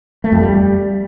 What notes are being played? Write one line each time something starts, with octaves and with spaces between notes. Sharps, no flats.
A3
F2
G3